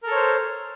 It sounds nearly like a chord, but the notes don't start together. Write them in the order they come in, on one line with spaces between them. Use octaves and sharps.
A#4 A4 C#5 C5